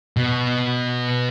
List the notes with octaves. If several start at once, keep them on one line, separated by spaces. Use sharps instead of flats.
B2